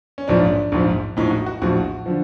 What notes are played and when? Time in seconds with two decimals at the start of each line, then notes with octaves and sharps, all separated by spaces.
0.18 C#4
0.28 A#1 G#2 F3 D4
0.72 A#1 G#2 F3
1.17 A#1 A2 F3 D#4
1.31 F#4
1.46 F#4
1.62 A#1 A2 F3 F#4
2.06 D3 F3